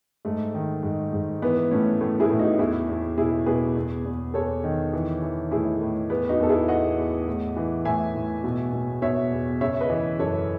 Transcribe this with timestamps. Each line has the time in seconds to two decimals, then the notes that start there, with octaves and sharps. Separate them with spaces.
0.25 G#2 A3
0.54 D#3
0.83 G#2
1.13 G#2
1.42 E3 B3
1.71 A2 A3 C#4
2.01 A2 A3
2.20 E4 G#4
2.30 A2
2.39 D#4 F#4
2.59 E2 E4 G#4
2.88 E2
3.17 B2 E4 G#4
3.46 B2 G#4 B4
3.76 E2
4.05 E2
4.34 E2 A4 C#5
4.64 D#3
4.93 E3
5.22 E3
5.51 A2 E4 G#4
5.81 A2
6.10 E2 B3
6.29 D#4 F#4
6.39 E2 A4
6.49 E4 G#4
6.68 E2 D#5 F#5
6.98 E2
7.27 A2
7.56 E3
7.85 A2 E5 G#5
8.15 A2
8.44 B2
8.73 B2
9.02 B2 C#5 E5
9.32 E2
9.61 C#3 C#5 E5
9.81 B4 D#5
9.90 E3
10.19 F#2 A4 C#5